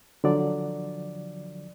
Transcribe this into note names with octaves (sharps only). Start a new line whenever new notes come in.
D3 F3 F#3 D5